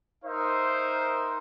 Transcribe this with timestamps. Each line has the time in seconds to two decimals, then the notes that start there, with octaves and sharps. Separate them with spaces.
0.24 D#4 A#4 C5 E5